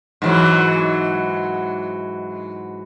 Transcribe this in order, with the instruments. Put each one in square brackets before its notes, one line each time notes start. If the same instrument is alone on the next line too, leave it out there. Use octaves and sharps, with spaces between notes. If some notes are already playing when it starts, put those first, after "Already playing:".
[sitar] G#2 E3 F#3